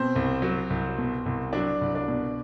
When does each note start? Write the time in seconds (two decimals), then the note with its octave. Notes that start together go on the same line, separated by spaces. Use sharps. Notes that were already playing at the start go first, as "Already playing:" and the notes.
Already playing: B2 C4 C5
0.16 C2
0.42 F#3
0.70 C2
0.98 B2
1.26 C2
1.53 F#3 D4 D5
1.81 C2
1.94 D4 D5
2.08 B2